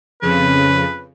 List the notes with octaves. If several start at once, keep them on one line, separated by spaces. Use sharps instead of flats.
F2 C#3 B4